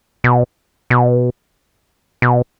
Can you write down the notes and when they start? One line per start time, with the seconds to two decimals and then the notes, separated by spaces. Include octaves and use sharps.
0.24 B2
0.90 B2
2.22 B2